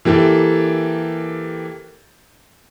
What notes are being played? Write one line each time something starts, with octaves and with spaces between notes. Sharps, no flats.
E3 A#3 G4 A4